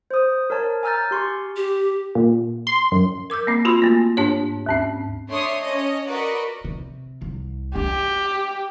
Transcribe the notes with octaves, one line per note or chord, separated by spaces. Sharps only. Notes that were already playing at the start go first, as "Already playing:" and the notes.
C5 D#6
A#4 C#5 A5
G#5 A#5 E6 F6 G6 A6
G4 C6 C#6
G4
A#2
C6
F#2
A#4 D6 E6 G6
A#3 C4
F4 F#4 B5 C6
A3 A#3
G#2 D4 G4 C#5
D#2 G#2 C4
A3 D4 C#5 C6 D#6
C#4 C#5 D#5
F#4 A#4 B4 D5 D#5
C3
C2
D4 G4